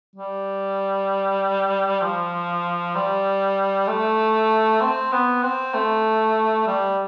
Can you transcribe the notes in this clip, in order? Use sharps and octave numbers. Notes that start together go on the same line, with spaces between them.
G3
F3
G3
A3
C4
B3
C4
A3
G3